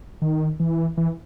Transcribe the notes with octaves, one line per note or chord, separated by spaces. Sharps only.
D#3
E3
E3